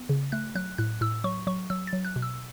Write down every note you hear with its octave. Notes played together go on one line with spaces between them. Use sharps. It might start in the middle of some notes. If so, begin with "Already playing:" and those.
Already playing: B3
C#3
A3 F#6
F#3 F#6
A2 F#6
A2 E6
F#3 C#6
F#3 C#6
F#3 E6
A6
F#3
F#6
B2
E6